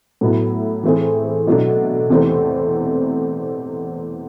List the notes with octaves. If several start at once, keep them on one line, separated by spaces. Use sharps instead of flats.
A2 F#3 B3 E4 A4
E3 A3 C4 E4 G#4
B2 F#3 A3 D4
E2 C3 E3 A3 C4